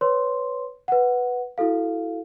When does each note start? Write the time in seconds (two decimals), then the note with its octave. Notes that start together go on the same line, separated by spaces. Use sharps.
0.01 B4 C#5 C6
0.88 B4 F#5
1.58 E4 F#4 A4 F5